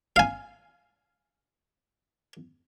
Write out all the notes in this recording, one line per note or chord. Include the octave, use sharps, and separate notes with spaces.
F5 G#5